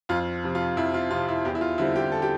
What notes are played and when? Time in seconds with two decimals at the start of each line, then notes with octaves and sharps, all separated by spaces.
0.09 F2 F4
0.44 C3 F3
0.55 F4
0.77 F2 E4
0.94 F4
1.11 C3 F3 F4
1.28 E4
1.45 E2 G4
1.55 E4
1.61 F4
1.78 D3 G3 C4 E4
1.96 G4
2.12 A4
2.22 G4